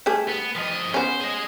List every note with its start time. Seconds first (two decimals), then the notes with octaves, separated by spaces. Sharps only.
0.06 G3 A3 G#4
0.29 B3
0.56 F3 D#5
0.94 B3 C#4 C5
1.21 G#4 D#5